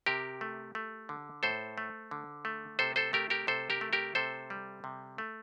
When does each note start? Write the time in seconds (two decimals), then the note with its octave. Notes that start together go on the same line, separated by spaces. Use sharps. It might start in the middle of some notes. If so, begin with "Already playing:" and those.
0.06 C3 G4 A#4
0.41 A3
0.75 A3
1.09 D3
1.43 A2 A4 C5
1.78 A3
2.11 D3
2.45 A3
2.79 C3 A4 C5
2.96 A4 C5
3.13 A3 G4 A#4
3.30 G4 A#4
3.47 C3 A4 C5
3.70 G4 A#4
3.81 A3
3.93 G4 A#4
4.15 C3 A4 C5
4.50 G3
4.84 C3
5.18 A3